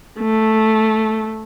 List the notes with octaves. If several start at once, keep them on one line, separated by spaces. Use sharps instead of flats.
A3